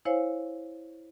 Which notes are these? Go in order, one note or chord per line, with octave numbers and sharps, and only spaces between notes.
E4 C5 C#5 F5 G#5